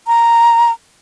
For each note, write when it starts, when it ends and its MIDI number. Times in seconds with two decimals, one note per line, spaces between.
0.07 0.71 82